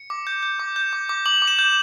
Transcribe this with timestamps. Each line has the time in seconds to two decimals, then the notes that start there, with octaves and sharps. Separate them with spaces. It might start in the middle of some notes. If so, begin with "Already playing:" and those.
Already playing: C#7
0.10 D6
0.27 G6
0.43 G6
0.59 D6
0.76 G6
0.93 D6
1.09 D6
1.26 D6 F#7
1.42 D6
1.47 E7
1.59 G6